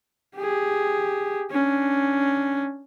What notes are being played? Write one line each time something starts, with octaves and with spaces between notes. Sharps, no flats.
G4 G#4
C#4 D4